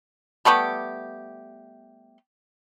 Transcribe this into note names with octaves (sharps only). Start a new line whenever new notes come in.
G3 A3 B3 G4